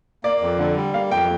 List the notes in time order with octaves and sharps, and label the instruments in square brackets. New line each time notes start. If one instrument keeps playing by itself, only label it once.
[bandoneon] A#3 [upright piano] D5
[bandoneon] F2
D3
G3
[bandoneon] A#3 [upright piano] F5
[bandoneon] F2 [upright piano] G5